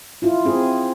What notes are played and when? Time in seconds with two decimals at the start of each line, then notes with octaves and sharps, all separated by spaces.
0.22 E4 F4
0.45 C4 G#4